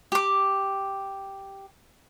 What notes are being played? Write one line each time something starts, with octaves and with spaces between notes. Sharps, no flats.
G4 D6